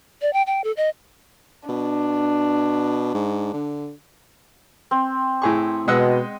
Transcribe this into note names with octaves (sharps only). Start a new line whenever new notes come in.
D5
G5
G5
A4
D#5
B2 D4
G#2
D3
C4
A2 G#4 C#6
B2 G#3 D#5 F#5 E6